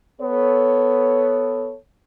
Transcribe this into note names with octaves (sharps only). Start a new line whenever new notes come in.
B3 A4 C#5